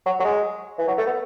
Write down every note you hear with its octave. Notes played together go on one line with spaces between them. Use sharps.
F#3
F#3
G#3
E3
F#3
A3
B3